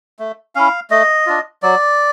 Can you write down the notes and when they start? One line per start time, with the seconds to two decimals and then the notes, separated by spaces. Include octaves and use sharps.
0.19 A3
0.55 C#4 E4 F5
0.90 A3 D#5
1.26 D4 F4
1.63 F#3 D5